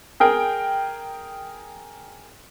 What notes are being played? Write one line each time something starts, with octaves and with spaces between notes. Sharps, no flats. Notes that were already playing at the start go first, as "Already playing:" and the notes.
G#4 A#4 G5